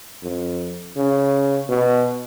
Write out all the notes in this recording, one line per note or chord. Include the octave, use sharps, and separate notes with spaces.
F2
C#3
B2